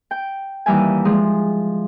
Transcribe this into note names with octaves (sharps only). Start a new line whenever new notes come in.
G5
D#2 E3 G3 E5 G#5
F3 G#3